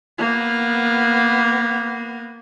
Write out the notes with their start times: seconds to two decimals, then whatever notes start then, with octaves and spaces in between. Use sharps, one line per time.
0.18 A#3 B3